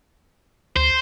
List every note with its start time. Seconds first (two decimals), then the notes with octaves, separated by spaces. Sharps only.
0.76 D2 C5